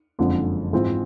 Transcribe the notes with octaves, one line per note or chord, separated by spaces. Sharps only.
F#1 F2 D3 F3 G#3
G#2 E3 G#3 C4 F4